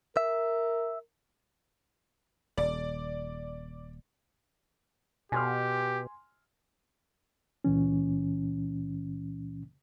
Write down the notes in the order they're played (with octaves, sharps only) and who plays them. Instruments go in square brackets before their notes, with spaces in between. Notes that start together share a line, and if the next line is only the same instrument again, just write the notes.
[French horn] A#4 [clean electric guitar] E5
[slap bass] D#1 [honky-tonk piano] D5
[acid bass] B2 [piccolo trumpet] G4 [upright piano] G#5 C6 F6
[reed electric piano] C#2 A#2 E3 C#4